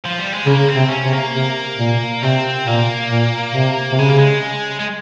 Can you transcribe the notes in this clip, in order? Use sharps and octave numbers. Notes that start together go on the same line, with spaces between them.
F3
G3
G#3
C#3 A#3
C4
C3
C#4
C3
A#3
C3
A#2
C3 C4
A#2 A#3
A#2
C3
C3
C#3 G#3
A#3
G#3
G#3